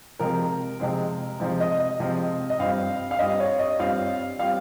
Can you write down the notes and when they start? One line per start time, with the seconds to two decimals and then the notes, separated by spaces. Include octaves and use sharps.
0.19 C3 F3 G#3 C4 A#4
0.80 C3 F3 G#3 C4
1.40 C3 F3 G#3 C4
1.60 D#5
1.80 D#5
2.00 C3 F3 G#3 C4
2.50 D#5
2.59 G2 G3 C4 F4 F5
3.11 F5
3.19 G2 G3 C4 F4 D#5
3.40 C#5
3.59 D#5
3.79 G2 G3 C4 F4 F5
4.39 G3 C4 F4 F5